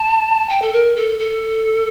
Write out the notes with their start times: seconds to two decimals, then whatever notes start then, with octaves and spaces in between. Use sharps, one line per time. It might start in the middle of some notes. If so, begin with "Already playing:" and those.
Already playing: A5
0.49 G5
0.62 A4
0.73 A#4
0.96 A4
1.19 A4